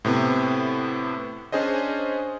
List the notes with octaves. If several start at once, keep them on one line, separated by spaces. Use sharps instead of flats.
A2 C3 B3
C#4 D4 G#4 C5 D#5